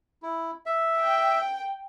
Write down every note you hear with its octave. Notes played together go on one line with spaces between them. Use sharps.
E4
E5
G5